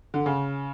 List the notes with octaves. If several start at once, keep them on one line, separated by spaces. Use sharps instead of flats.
D3
C#3